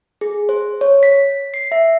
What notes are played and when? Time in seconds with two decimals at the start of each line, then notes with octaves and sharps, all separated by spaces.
0.21 G#4
0.49 C5
0.81 C#5
1.03 B6
1.54 C7
1.72 E5